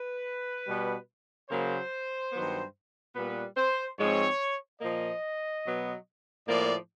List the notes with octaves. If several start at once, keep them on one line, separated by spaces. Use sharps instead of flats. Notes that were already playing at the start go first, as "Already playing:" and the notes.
Already playing: B4
B2 G3 B3
C#3 F#3 A#3 C5
G2 D#3 F#3 B3
A#2 G3 B3 B4
C5
G#2 F3 G#3 C4 C#5
A#2 F3 A#3 D#5
B2 F#3 B3
A2 F3 A#3 D5